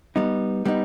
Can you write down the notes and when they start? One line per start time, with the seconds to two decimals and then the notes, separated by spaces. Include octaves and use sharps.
0.16 G3 B3 D#4
0.65 G3 B3 D#4